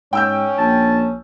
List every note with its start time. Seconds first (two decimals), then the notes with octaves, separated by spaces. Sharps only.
0.13 G#2 C#4 G5 E6 G6
0.58 A#1 A5